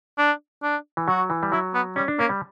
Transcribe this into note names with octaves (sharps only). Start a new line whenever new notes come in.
D4
D4
E3
F#3 F#4
E3
G3
F#3 E4
B3
G3 C#4
D4
A#3 C#4
G3